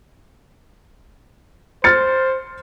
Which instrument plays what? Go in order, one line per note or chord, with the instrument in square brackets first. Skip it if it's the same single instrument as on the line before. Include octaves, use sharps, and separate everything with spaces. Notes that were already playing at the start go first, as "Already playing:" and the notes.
[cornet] C5 [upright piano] F6 A6 C#7